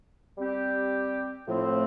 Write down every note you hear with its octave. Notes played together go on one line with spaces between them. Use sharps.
G3 C4 G4
A2 F3 A3 C4